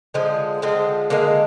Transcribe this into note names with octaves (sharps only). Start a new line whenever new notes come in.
D3 F3 G#3
D3 F3 G#3 C4
D3 G#3 A#3